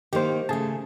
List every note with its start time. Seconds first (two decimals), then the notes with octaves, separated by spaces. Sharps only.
0.13 D#3 A#3 E4 G4 C5
0.49 C#3 A3 G#4 A5